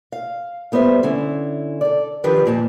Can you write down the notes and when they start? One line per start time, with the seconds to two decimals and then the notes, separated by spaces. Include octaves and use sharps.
0.12 F5
0.72 G3 B3 C5 D#5 E5
1.03 D3 C#4 E4
1.81 A4 D5
2.24 D#3 F3 D4 G4 B4
2.46 F2 A#2 A5